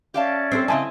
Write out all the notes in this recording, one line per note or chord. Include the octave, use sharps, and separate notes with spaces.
C#4 G4 D5 E5 F5 A5
C4 D4 A4
C#3 C4 E4 D#5 G#5 A5